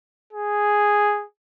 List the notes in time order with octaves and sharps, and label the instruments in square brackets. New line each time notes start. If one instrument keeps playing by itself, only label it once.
[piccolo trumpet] G#4